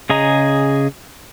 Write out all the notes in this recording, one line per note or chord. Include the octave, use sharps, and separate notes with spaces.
C#3 G#4 D#5 A#5